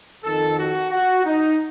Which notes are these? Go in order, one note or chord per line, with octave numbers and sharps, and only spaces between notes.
F2 D#3 A4
F#4
F#4
D#4